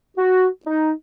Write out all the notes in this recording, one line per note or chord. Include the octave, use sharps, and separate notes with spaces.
F#4
D#4